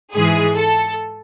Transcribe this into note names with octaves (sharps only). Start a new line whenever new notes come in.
G#2 E3 G#3 G#4
A4